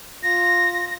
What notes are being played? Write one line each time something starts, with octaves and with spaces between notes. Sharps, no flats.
F4 A#6